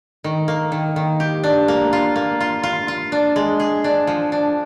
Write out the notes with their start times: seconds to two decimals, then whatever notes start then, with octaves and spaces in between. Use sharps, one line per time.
0.24 D#3
0.48 A#3
0.72 D#3
0.96 D#3
1.20 G4
1.44 D4
1.68 A#3
1.93 F4
2.16 A#3
2.40 F4
2.63 F4
2.88 F4
3.12 D4
3.36 G#3
3.60 G#4
3.84 D4
4.07 F3
4.32 D4